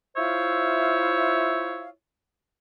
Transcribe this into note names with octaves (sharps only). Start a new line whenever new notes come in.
E4 F4 C5 C#5 E5 F5